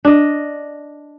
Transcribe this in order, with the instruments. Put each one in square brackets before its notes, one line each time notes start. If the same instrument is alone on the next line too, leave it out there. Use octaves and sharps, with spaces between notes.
[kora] D4 D#5